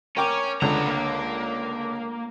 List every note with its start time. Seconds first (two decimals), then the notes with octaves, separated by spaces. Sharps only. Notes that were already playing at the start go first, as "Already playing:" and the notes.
0.17 C#4 A#4 G5 D6
0.62 C#2 D3 B3 A#5
0.88 A#3